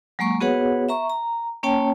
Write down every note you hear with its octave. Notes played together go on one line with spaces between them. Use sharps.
F#3 G#3 A#3 C#6
B3 F#4 G#4 B4 C#5 F#5
E5 A#5 C#6
A#5
A#3 C#4 C#5 G5 A5